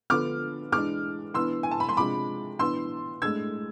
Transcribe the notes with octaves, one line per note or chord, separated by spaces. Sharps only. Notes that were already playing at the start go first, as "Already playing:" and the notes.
D3 F3 B3 D4 D6 F6
E3 G#3 D4 D6 F6
E3 B3 D4 C6 E6
G#5
A5
B5
C6
C3 F3 G#3 D4 B5 D6
E3 B3 D4 C6 E6
A2 G#3 D4 E6 G#6